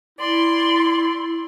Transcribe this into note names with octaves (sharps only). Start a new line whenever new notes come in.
E4 D5 C6